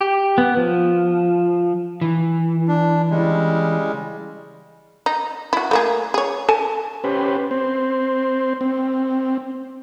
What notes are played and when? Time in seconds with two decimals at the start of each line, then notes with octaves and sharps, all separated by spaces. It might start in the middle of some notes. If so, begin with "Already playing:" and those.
0.01 G4
0.38 B3
0.57 F3
2.01 E3
2.68 D4
3.10 C#3 G3 G#3
5.06 D#4
5.53 E4 F#4
5.71 A3 A#3 G#4
6.14 G#4 C#5
6.48 A4 G#5 A5
7.04 C#4 G4 B4 C5
7.51 C4 C5
8.61 C4